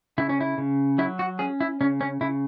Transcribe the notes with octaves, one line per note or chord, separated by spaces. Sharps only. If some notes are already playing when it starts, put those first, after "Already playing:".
C#3 E4
C#4
E4
C#3
F#3 E4
F#4
C#4 G#4
E4
C#3 C#4
C#4
C#3 E4